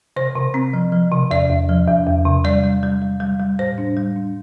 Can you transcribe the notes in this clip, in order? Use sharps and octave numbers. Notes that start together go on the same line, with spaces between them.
C3 C5
C3
C4
F3
F3
C3
E2 D5
E2
F3
E2
E2
C3
G3 D5
G3
G3
G3
G3
G3
A2 C5
D4
G3
D4